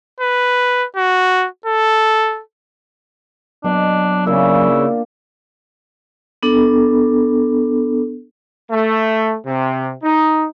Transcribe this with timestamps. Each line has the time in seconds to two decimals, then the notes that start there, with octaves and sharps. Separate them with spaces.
0.20 B4
0.97 F#4
1.66 A4
3.64 B2 F#3 D4 D6
4.26 C#3 A#3 D4 E4 F4
6.43 B3 D4 A4
8.70 A3
9.45 C3
10.03 D#4